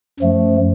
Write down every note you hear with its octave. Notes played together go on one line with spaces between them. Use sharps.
F#2 F3 A3